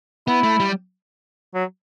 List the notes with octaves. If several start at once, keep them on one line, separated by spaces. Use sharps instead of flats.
B3 E4
A3
G3
F#3